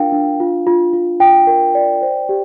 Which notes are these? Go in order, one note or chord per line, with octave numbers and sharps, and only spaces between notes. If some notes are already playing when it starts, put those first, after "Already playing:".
Already playing: D4 F4 A#4 F5 G5
D4
F4
F4
F4
F4 G5
A#4
D5
C5
G4